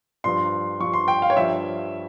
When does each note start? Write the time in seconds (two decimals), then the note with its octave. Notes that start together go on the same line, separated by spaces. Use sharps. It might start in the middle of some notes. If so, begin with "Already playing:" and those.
0.24 G2 F3 C6
0.80 G2 F3 C#6
0.93 C6
1.08 G5
1.22 F5
1.30 C#5
1.36 G2 F3 E5